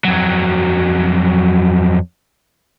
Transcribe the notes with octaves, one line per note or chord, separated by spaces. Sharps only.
F2 F#3